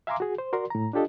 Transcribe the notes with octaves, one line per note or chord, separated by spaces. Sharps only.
E5 F5 G#5 A#5 C6 D6
F#4 G#4
C5
F#4 A#4 D5 C6
A2 A#5
D4 F4 G4 A4 D#5